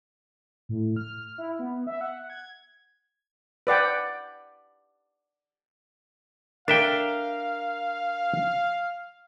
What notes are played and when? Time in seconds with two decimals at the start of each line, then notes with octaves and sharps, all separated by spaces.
0.69 A2
0.96 F6
1.38 E4
1.59 B3
1.87 E5
2.01 F#5
2.30 G#6
3.67 B4 D5 F#5 G5
6.68 D4 A#4 E5 F5 G5